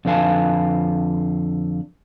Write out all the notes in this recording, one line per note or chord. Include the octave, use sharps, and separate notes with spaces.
F2 D3 B4 F5 G#5 A5